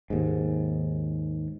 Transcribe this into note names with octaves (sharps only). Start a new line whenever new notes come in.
D#2 G#2